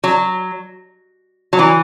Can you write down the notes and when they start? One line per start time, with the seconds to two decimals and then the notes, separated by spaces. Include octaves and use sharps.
0.04 F#3
1.53 F#3
1.59 E3